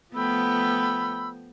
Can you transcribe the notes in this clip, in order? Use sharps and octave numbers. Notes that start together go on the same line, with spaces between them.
F3 A3 B3 G5 B5 E6